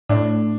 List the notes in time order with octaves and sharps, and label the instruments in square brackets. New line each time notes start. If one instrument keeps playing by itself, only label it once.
[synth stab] A2 [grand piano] D4